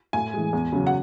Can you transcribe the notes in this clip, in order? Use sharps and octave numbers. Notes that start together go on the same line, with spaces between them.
A2 G#5
E3 G#3
E2
C#3 F#3
F#5